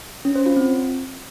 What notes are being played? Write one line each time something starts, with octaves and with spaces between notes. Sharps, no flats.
C#4
C5
F4
C4